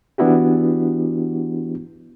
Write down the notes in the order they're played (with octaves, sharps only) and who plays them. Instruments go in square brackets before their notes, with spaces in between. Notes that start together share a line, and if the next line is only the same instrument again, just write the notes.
[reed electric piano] E3 B3 D4 E4 F#4 G4